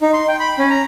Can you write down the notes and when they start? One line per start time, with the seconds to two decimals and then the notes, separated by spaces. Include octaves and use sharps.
0.01 D#4
0.13 C6
0.28 G5
0.40 B5
0.59 C#4
0.70 A#5